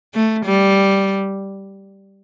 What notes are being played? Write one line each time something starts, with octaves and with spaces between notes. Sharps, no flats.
A3
G3